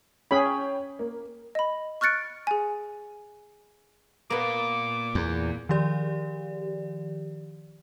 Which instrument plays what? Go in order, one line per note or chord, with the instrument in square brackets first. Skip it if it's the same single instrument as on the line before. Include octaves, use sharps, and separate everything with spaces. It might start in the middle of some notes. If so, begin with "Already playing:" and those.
[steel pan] C#4 G#4 B5 [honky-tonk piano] C#5 G5
[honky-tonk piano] A#3
[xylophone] D#5 B5
C#6 F6 F#6 A6 C#7 D7
G#4 G#5
[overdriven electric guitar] A#2 [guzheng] A#3 B3 [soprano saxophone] D6
[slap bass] E2
[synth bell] D#3 F3 G4 D5